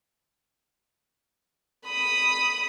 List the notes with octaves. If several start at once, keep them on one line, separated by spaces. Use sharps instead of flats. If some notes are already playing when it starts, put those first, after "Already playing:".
B5 D#6